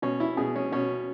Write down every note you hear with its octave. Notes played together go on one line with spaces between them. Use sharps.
B2 C#4
E4
B2 G#4
C#4
B2 C#4